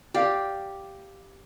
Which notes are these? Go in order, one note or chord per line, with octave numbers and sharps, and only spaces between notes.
G4 D5 F5